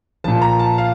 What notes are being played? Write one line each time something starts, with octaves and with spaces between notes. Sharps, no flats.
A#2 F3 A5
A#5
A5
F5